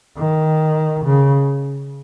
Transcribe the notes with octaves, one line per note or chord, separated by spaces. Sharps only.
D#3
C#3